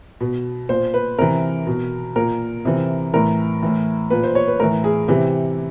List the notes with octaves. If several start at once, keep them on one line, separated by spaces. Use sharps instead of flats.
B2
A#2 C5
B4
C3 E3 A#4
B2
A#2 A#4
C3 E3
A2 E3 A#4
A2 E3
A#2 B4
C5
C#5
B4
A2 E3 A#4
G#4
C3 E3 G4